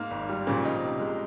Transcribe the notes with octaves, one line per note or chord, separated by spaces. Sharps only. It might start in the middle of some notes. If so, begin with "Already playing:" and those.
Already playing: G#2 A#3
G#1
G3
A#2 C#3 F3
D#4
C3
G#3